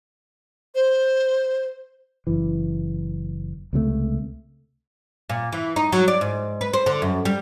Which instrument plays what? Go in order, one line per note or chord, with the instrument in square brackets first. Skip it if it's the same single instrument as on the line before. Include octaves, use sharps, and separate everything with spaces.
[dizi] C5
[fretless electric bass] F#1 E3
C#2 C3 F3 A3
[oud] A#2
E3
D#4
F#3
D5
G#2
B4
C5
D3
F#2
G3